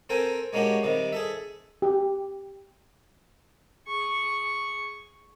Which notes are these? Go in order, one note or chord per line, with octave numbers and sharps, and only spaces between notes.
C4 A4 A#4 G5 G#5
G#3 A#3 C#4 D4 F#4 G4
C3 D#3 G3
G#4 A4 E5
G4
G#4 C#6